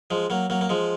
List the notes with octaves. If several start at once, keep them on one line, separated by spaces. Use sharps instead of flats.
F3 G#3
F#3 A#3
F#3 A#3
A#3
F3 G#3